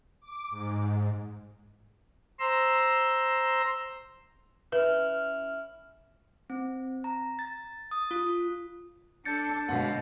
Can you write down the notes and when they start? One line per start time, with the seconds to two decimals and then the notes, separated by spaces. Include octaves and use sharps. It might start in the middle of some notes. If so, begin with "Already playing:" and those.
0.21 D6
0.50 G#2
2.39 C5 A#5 C6 E6
4.72 C#4 E4 B4 F6
6.50 C4
7.04 A#5
7.39 A6
7.91 D#6
8.11 F4
9.25 D4 A4 G6 A6 C#7
9.68 G1 B2 G#3 F#5